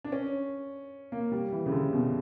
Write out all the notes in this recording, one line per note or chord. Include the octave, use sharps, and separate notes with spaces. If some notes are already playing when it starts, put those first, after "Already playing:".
D4
C#4
A#3
G3
E3
C#3
D3
B2